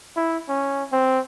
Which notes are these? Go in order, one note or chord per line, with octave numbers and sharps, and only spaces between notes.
E4
C#4
C4